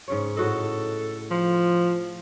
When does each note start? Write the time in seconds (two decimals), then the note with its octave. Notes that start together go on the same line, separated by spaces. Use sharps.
0.08 G#2 C#3 C#5
0.37 A2 F#4 A4 D#5
1.30 F3